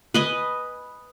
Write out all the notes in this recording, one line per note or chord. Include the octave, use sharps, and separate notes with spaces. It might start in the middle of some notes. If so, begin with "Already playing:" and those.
B4 D#5 G#5